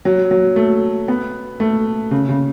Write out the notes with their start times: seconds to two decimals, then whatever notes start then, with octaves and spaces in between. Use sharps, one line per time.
0.05 F#3
0.31 F#3
0.56 A3
1.08 B3
1.60 A3
2.11 C#3
2.29 C#3